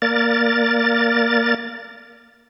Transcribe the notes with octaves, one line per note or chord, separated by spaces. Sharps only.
A#3 A#4 D5 A6